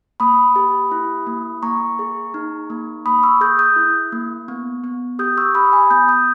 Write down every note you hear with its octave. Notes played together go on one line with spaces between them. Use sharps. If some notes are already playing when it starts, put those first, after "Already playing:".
A#3 B5 D#6
G4
E4
A#3
A#3 A#5 C#6
G#4
D#4
A#3
A#3 B5 D#6
C#6 E6
G#4 D#6 G6
D#6 G6
E4
A#3
B3
B3
G4 D#6 G6
C#6 E6
G4 B5 D#6
G#5 B5
B3 D#6 G6
D#6 G6